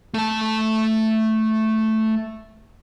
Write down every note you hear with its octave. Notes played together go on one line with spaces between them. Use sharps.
A3 A5